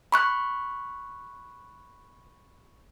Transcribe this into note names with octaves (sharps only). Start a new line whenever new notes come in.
B5 C#6 F#6